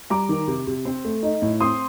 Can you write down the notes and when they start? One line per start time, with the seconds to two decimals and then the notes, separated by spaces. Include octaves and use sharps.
0.10 G3 A#5 D6
0.29 D#3
0.48 C3
0.67 C3
0.85 C4
1.04 A3
1.23 D#4
1.42 A2
1.60 C4 C6 D#6